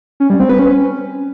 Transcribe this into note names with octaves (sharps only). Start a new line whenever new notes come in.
C#4
G3
C4
B4
C#4